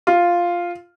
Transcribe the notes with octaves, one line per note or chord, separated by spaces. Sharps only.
F4